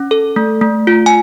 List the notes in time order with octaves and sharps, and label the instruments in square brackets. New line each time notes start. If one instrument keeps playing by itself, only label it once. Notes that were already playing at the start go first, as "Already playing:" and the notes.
Already playing: [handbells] C#4
A4
A3
A3
F4
G#5